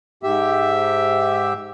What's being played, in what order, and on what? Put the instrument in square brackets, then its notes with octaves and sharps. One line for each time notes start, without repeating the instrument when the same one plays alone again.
[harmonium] G#2 G4 E5